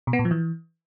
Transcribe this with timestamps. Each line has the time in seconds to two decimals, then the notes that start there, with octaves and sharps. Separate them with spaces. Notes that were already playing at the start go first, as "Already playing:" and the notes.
0.07 B2
0.13 B3
0.19 A#2
0.25 F3
0.31 E3